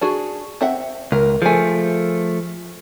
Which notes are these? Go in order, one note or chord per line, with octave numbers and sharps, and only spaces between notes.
D4 F#4 G#4
C4 E5 F#5
C#2 A#4
F3 A3 G#4 G#5